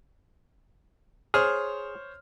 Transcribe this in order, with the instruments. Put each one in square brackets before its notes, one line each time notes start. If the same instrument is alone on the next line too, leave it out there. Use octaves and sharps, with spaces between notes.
[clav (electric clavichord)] G#4 [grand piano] C5 C#5 F6